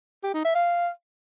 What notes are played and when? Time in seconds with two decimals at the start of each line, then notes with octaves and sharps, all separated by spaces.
0.24 G4
0.34 D#4
0.45 E5
0.55 F5